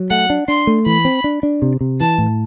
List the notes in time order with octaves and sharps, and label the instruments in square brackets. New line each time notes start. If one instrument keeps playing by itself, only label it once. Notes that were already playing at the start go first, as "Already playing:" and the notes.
Already playing: [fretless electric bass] F#3
[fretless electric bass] A3 [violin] F#5
[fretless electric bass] D4
[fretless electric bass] D4 [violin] C6
[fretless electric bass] A3
[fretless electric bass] E3 [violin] B5
[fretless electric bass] C4
D4
D4
C3
C3
[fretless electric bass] E3 [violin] A5
[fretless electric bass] A2